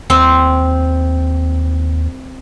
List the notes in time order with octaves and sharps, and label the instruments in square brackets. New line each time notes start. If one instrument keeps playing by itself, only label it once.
[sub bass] D#2 [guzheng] C4